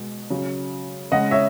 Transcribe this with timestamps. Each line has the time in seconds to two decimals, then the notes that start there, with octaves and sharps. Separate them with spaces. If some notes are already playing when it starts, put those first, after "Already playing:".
Already playing: B2 G#3
0.30 C#3 F#3
1.12 C#3 G#3 D#5 F#5
1.31 C#5 E5